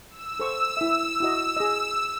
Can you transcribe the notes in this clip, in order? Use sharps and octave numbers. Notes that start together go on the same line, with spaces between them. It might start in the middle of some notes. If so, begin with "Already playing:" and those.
E6
A4 C5 C#6
E4 E5
E4 F#4 D#5
G#4 D#5